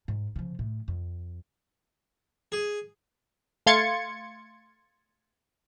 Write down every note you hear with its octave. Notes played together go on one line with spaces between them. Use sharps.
G#2
C#3 F3
A2
F2
G#4
A3 F5 C6 G#6 A6 C#7